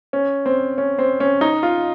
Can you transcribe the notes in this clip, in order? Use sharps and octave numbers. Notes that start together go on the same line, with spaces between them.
C#4
C4
C#4
C4
C#4
D#4
F4